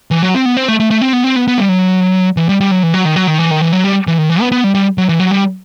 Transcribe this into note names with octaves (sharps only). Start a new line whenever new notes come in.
E3
F#3
C4
B3
C4
A3
A3
A3
C4
B3
C4
B3
B3
G3
F#3
E3
G3
G3
F#3
E3
F#3
D#3
F#3
D#3
E3
D#3
E3
F#3
G3
E3
D#3
E3
B3
B3
G3
G3
F#3
E3
F#3
G3